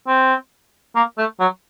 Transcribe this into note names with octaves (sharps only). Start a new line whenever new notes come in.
C4
A#3
A3
F#3